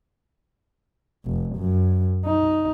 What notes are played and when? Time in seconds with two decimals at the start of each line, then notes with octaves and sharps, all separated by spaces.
1.26 F1
1.57 F#2
2.26 D#4